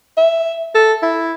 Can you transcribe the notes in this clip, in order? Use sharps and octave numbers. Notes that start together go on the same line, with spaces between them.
E5
A4
E4